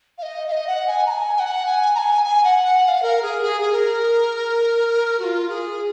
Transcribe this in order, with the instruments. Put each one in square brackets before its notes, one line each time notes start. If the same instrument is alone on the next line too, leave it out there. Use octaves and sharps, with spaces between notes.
[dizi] F5
D#5
F5
D#5
F#5
G#5
A#5
G#5
G#5
F#5
G#5
A#5
G#5
G#5
F#5
F#5
F#5
F5
A#4
G#4
G#4
G#4
A#4
F#4
F4
G#4